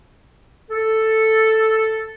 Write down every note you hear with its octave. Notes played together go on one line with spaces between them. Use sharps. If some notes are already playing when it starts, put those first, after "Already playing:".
A4